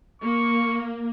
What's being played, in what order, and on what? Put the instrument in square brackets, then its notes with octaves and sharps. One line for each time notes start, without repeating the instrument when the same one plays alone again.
[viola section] A#3 [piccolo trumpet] C#6